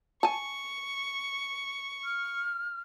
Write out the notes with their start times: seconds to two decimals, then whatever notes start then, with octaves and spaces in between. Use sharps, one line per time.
0.23 G#5 A5 C#6
2.04 F6